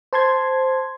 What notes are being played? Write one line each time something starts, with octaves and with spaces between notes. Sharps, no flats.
C5 A5 C6 G#6